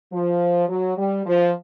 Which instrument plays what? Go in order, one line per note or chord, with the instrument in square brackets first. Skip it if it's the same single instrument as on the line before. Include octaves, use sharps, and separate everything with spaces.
[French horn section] F3
F#3
G3
F3